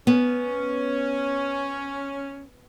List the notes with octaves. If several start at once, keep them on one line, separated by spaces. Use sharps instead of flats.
B3 C#4